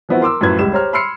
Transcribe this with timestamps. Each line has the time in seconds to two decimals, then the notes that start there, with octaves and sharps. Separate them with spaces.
0.09 E3 F3 B3 C4 E4 F#4
0.21 A#4 C6 D6 E6
0.41 F#2 A2 F3 F#3 B4 G#6
0.59 C#2 G3 G4 E7
0.73 G4 C5 C#5 A#5 F6
0.93 B5 C6 E6 F6 C7 C#7